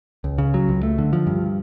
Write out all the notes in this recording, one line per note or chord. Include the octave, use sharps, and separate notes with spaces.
C#2
C#3
F#3
C#2
A3
D3
F3
G2